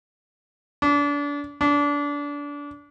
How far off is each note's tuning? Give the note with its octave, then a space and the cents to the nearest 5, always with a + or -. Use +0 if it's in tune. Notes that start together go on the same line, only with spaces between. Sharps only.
D4 -30
D4 -25